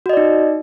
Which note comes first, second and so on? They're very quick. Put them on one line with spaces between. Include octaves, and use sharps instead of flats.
F#4 D#5 D5 D#4